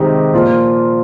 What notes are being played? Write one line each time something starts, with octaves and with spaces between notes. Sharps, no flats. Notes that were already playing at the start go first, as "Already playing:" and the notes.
Already playing: C3 D#3 G#3 D#4 G4
A#2 F3 A#3 F4